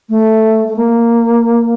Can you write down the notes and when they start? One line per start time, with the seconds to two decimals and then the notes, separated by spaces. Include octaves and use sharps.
0.09 A3
0.68 A3
0.76 A#3